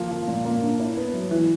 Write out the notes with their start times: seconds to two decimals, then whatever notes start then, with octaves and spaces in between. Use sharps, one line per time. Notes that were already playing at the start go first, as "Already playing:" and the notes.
Already playing: F3 A#3 F4
0.11 F3
0.28 A#2
0.45 A#3
0.63 D4
0.80 E4
0.97 B3
1.14 F#3
1.31 E3